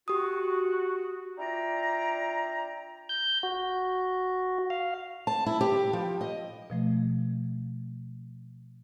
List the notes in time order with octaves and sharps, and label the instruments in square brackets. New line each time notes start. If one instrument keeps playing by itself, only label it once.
[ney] F#4 [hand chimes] G4 D#6
[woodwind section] D4 E4 F4 D5 G5 A#5
[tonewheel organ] G6
F#4
F5
[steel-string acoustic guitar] A5
E4
G4
F3
D#5
[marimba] B2 F3 A3